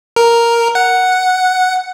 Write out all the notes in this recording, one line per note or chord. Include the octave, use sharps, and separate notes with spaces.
A#4
F#5